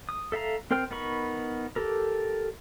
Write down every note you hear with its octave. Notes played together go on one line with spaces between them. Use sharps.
D#6
A4 E5 F5 A#5
C4 A#4 C5 G5 F6
B3 D#4 A#4 B5 C#6
G4 A4 A#4